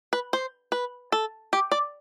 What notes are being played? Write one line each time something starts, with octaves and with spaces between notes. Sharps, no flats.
B4
C5
B4
A4
G4
D5